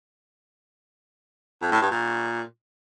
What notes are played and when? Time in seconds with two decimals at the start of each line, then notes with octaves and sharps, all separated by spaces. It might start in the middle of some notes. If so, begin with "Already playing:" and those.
1.62 F2
1.72 A2
1.82 G2
1.91 A#2